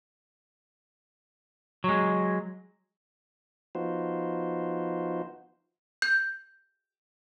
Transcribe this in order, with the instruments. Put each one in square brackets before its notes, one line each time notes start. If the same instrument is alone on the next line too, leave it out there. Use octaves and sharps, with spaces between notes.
[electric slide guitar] F#3 G#3
[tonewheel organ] F3 B3 D#4 F4 F#4 C5
[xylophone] G6